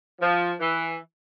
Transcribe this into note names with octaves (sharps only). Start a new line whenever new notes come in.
F3
E3